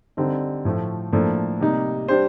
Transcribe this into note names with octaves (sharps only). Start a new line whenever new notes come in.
D3 G3 C4 D#4
A2 F3 A3
A2 F3 A#3 D4 A4
C3 G3 A#3 D#4
G3 D4 G4 C5